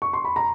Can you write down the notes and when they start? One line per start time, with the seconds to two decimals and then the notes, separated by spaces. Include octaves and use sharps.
0.02 C#6
0.13 C6
0.25 B5
0.36 A#5